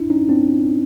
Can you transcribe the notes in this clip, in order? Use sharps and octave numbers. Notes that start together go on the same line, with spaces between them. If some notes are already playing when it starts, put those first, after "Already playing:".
Already playing: D4 E4
C#4 D#4
C4 D4